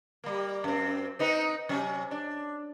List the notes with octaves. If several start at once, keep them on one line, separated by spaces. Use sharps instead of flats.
G3 A#3
F#2 C4
C4 D#4 B4
C3 F#3 C#4
D4